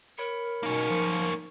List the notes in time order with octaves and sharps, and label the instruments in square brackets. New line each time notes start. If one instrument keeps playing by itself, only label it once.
[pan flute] A#4 [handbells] C#5 B5 C#7
[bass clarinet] B2 [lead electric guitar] A#3 C#4 [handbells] D#4
[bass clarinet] F3